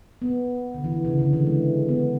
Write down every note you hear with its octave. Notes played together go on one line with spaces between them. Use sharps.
B3
D3
E3
C#3
D3
E3
G#3
B3